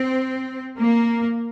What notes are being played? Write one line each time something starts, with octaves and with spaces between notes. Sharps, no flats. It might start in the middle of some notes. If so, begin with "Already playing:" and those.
Already playing: C4
A#3